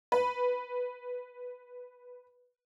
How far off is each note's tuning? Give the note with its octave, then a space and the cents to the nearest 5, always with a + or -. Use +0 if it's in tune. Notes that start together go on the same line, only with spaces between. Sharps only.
B4 +0